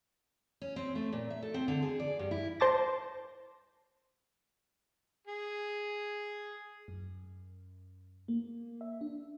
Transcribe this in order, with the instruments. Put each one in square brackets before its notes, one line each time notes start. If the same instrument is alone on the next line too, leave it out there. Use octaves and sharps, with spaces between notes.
[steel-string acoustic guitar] C#4
C4
A3
A#2
E5
A4
C4
D3
G#4
D5
G2
E4
[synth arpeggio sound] C5 A5 D6 A#6
[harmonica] G#4
[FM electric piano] F#2
A#3
E5
D4